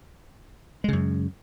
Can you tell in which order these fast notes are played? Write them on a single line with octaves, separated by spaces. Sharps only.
G#3 C#3 F#2